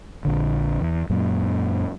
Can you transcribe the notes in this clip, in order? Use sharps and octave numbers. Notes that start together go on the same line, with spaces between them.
A#1 D3
E2
F#2 A#2